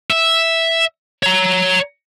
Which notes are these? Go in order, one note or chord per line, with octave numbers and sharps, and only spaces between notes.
E5
C#5 A#5